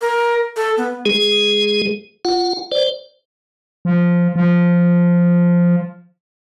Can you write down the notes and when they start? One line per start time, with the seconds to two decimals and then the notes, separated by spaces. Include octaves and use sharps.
0.01 A#4
0.56 A4
0.78 B3
1.05 G#3 G#4
2.25 F4 F#5
2.72 C5 D5
3.85 F3
4.36 F3